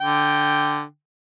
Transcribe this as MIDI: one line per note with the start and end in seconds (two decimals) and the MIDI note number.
0.01 0.83 50
0.01 0.83 79